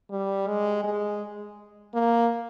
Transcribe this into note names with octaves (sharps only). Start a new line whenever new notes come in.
G3
G#3
G#3
A#3